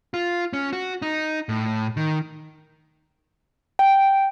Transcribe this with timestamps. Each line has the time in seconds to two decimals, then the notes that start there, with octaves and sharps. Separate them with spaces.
0.14 F4
0.53 C#4
0.73 F#4
1.02 D#4
1.49 A2
1.97 D#3
3.79 G5